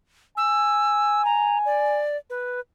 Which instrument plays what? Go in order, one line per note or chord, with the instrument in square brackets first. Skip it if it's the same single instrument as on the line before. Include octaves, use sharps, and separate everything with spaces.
[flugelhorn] G#5 [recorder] E6
[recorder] A#5
D5
B4